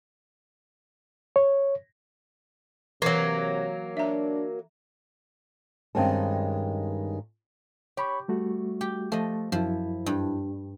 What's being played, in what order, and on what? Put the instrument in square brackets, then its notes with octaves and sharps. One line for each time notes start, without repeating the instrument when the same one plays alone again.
[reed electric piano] C#5
[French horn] C3 [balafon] E3 [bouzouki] F#3 A#3
[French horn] D4 [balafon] E5 A#5
[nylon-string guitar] G2 D#3 G#3 C4 C#4 A5
[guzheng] G4 [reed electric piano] C#5 B5 C#6
[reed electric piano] G3 A3 F#4
[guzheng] G4
[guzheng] F3 D#5 [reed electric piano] A3
[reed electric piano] F#2 E4 [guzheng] F3
[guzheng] G2